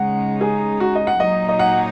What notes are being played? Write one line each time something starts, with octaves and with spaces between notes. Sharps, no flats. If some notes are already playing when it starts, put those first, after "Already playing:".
Already playing: C#3 G#3 D#4 F#5
G#4
F#4
D#5
F#5
A#2 F#3 D#4 D#5
D#5
F#5